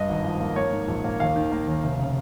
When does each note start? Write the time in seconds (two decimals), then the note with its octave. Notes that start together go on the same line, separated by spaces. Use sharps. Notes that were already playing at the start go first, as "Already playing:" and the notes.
Already playing: G2 D#5
0.09 G#1
0.24 F3
0.40 A#3
0.56 A#3 C#5
0.72 G#2
0.88 A#1
1.04 A#3
1.20 D#2 F5
1.36 D#3
1.52 A#3
1.67 D#2
1.83 F1
1.99 C#3